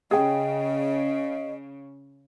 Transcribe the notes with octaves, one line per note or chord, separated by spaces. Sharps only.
C#3 G#4 D#5 G5